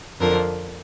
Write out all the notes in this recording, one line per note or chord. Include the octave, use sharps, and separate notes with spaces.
F2 D3 F3 A#4